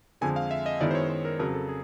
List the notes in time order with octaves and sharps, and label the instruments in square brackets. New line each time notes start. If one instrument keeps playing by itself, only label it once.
[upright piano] F2 D3 F3 G#3 [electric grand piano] G#5
[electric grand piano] F5
E5
D#5
[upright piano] F#2 D#3 G#3 B3 E4 [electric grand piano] D5
[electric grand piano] C5
C#5
C5
A#4
[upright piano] F2 C#3 F#3 [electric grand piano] A#4
[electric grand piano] A4
G#4